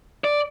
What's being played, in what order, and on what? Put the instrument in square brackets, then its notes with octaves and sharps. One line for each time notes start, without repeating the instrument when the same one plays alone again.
[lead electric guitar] D5